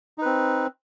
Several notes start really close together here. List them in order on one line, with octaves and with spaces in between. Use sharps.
D#4 B4 C4